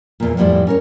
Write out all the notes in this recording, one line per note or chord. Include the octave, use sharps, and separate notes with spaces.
E2 A#2
F2 A2 E3 G3 C5 D5
C#4 A#4 C#5